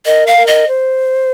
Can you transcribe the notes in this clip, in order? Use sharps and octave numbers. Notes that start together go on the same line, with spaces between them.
A#4 D#5
F5
A#4
D#5
C5